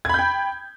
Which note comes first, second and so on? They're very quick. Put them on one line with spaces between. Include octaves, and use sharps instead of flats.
G#6 B5 G6 G5